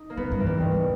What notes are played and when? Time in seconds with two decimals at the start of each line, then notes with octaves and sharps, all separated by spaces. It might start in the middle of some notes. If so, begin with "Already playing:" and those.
Already playing: D#4
0.10 A#3
0.17 D#3 B3
0.31 G2 A#3
0.40 E3
0.46 G#2 G3
0.60 G#2 D#3
0.75 B2